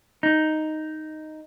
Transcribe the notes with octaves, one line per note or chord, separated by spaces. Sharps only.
D#4